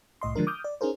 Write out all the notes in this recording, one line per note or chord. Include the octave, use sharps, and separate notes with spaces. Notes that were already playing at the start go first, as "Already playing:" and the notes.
C2 A2 D#5 C6
D3 F3 G#3 D4 A#4
D6 D#6 F6 G6
D5
C#4 D#4 G#4 A#4 C5